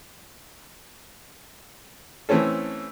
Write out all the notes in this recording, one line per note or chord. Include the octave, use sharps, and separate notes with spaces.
E3 A3 C4 C#4 A4